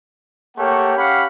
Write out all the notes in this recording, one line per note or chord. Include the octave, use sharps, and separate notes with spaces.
A3 A#3 G4 C#5 F#5
C#4 G4 F5 F#5 B5